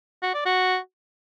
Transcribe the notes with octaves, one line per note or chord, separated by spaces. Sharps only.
F#4
D5
F#4